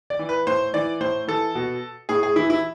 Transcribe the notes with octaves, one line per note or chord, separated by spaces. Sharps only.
D5
E3
B4
A2 C5
E3 D5
A2 C5
E3 A4
B2
A2 G#4
G#4
E3 E4
E4